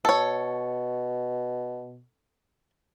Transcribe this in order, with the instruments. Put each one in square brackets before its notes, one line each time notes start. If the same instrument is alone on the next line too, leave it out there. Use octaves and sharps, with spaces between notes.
[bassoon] B2 [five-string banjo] A4 C#5